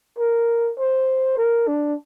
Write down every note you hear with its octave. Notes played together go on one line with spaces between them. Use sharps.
A#4
C5
A#4
D4